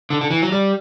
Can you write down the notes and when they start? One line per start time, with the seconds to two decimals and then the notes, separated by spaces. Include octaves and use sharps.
0.10 D3
0.21 D3
0.30 E3
0.42 F#3
0.52 G3